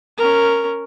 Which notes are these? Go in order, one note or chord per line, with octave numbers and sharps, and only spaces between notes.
C#4 A#4